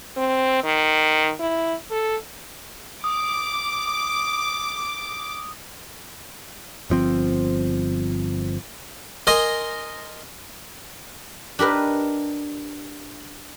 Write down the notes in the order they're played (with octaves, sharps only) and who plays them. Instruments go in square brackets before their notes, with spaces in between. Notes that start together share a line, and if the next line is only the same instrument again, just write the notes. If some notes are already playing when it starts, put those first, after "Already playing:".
[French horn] C4
D#3
E4
A4
[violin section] D6 [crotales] D#6
[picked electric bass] G1 F3 C4
[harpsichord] A#4 D#5 G#5 A#5 C6
[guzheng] D4 G4 A#4 B4 D#5